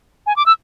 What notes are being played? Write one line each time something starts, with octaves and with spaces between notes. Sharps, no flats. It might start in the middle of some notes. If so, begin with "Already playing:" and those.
G#5
D6
E6